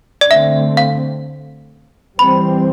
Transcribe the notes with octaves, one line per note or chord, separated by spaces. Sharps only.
D5
D3 A3 C4 E5
F5
E3 G3 C4 B5